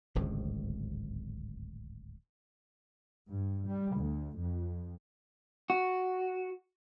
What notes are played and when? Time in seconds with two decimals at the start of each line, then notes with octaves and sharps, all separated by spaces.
0.15 D1 G#1 C#2 A2
3.28 G2
3.67 G3
3.96 D2
4.38 F2
5.70 F#4